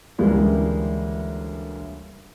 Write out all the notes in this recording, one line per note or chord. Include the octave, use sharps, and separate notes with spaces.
D2 C#3 E3 G3 G#3 A#3